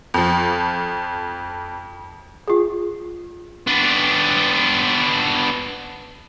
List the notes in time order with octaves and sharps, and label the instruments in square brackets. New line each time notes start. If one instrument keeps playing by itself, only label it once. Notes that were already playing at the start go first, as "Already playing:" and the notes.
[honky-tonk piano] F2 F3
[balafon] F4 G#4
[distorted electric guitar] B3 D4